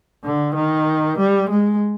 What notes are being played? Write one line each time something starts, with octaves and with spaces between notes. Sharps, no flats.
D3
D#3
G3
G#3